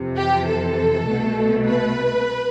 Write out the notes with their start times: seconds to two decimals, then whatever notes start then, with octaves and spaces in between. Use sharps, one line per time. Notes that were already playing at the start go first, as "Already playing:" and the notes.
Already playing: F2 C3 E3
0.16 G4
0.47 A4
1.07 C2 B2 A3
1.67 B4